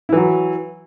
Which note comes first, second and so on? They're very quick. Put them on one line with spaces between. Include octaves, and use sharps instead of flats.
E4 E3 F#3